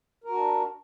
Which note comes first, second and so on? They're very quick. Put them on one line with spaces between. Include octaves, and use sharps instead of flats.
A#4 F#4 D4